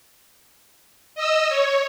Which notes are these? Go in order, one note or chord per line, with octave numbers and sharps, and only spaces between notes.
D#5 E6
C#5